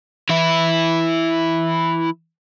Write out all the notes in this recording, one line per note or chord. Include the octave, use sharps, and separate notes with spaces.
E3 E4